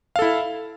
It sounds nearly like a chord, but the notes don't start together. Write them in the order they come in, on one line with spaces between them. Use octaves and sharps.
F5 A4 E4